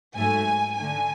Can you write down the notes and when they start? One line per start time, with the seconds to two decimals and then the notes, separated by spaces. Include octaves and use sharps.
0.17 G#2 F#3 A3 G#5
0.77 D3 A3 D4 G#5